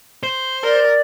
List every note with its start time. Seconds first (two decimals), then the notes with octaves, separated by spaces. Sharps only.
0.23 C5
0.63 A#4 D5